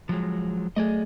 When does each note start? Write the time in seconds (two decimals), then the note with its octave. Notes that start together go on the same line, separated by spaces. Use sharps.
0.09 F3 F#3 G#3
0.76 F#3 A3 G#4 D5 D#5